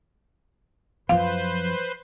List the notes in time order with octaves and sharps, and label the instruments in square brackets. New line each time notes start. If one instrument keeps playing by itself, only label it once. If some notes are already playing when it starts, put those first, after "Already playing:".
[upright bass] F#2 F3 [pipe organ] B4 C5 C6 [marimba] F5